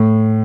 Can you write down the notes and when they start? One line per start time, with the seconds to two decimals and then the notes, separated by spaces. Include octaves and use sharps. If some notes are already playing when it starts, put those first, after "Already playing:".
Already playing: A2